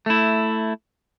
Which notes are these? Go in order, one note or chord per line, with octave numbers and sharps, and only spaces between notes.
A3 E4